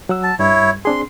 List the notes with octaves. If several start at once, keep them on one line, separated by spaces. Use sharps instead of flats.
F#3 F#5 E6
A5
G2 G3 E4 C#5
C4 D4 G#4 C6